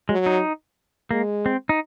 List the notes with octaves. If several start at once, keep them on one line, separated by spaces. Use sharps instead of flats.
F#3 G#3
D#4
G#3 A#3
C4
D#4